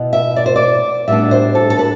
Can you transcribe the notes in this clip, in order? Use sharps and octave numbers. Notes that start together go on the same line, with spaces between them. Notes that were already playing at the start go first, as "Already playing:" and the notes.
Already playing: B2 B3 E4
E5
D5
C5
D5
A2 G3 B3 D4 E5
C5
A4
A4
B4